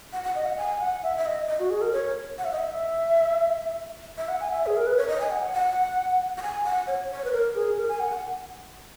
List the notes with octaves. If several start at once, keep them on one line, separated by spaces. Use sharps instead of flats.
F#5
F#5
D#5
F#5
G#5
F#5
E5
E5
D#5
D#5
F#4
G#4
A#4
C#5
F#5
E5
D#5
E5
E5
F#5
G#5
E5
G#4
A#4
B4
C#5
D#5
G#5
F#5
F#5
F#5
G#5
F#5
C#5
C#5
B4
A#4
G#4
A#4
G#5
F#5
F#5